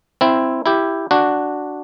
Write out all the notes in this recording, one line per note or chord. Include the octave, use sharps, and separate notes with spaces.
C4 E4
E4 G4
D4 F#4